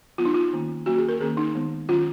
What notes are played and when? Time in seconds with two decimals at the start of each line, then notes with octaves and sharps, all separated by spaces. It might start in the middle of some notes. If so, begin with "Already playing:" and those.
0.18 F#3 B3 F4
0.25 D#4
0.34 F4
0.53 D#3 A#3 C#4
0.86 F#3 A#3 C#4 F#4
0.98 G#4
1.09 A#4
1.20 D#3 A#3 C#4 G#4
1.37 D#4
1.55 D#3 G#3 B3
1.89 D#3 F#3 C#4 F4